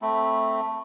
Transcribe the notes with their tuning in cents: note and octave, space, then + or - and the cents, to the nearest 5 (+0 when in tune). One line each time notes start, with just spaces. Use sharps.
A3 +0 C4 +0 B5 -10